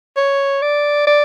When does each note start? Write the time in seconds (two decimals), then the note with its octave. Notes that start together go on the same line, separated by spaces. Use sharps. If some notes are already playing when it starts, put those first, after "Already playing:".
0.17 C#5
0.62 D5
1.07 D5